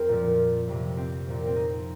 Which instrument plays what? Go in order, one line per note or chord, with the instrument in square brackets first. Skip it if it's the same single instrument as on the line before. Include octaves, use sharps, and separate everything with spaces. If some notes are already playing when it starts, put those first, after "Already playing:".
Already playing: [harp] F2 C4 A#4
A#2 F3
F2 C3 F3
C4
A#2 F3
C4
D#4